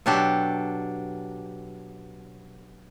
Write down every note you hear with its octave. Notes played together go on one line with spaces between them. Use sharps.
B2 F#3 D4 G4 A4